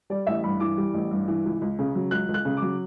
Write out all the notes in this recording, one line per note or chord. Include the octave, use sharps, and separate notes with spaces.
G3 D5
A1 E5
G2 B5
E3 D6
G3
A1
G2
E3
C#2
C#2
C#3
F#3
C#2 F#6
C#2
F#6
C#3
D6
F#3